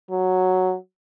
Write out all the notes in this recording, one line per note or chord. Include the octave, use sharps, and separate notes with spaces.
F#3